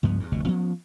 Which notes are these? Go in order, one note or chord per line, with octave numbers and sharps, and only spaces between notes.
C#2 G2 F3 B3
E2 G2
F1 D2 B2
F3 B3 C#4